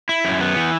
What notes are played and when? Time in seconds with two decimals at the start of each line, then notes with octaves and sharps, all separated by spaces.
0.09 E4
0.25 F#2
0.41 B3
0.56 E3